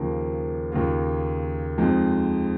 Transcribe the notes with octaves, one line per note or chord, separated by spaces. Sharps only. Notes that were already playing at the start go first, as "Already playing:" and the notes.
Already playing: D#2 C#3 F3 A#3
D#2 C#3 A#3 F4
F2 F3 G#3 D#4